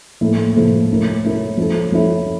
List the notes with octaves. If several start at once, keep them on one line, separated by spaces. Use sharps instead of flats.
A2 F3 A#3 E4 A4
A2 F3 A#3 E4 A4
A3 C#4 E4 A#4
A3 C#4 E4 A#4
F3 C#4 E4 A4
F3 C#4 E4 A4